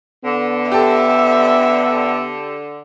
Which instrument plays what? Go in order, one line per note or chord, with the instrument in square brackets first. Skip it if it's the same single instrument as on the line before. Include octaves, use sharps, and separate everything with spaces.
[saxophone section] D3 [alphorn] B3
[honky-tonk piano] G4 A4 [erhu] E5